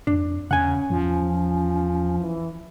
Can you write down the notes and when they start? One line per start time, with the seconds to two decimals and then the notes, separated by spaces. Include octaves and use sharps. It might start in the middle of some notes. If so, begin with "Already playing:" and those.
0.07 F2 D4
0.51 E2 C#3 C#4 F#5 G#5
0.90 E2 F3
2.19 E3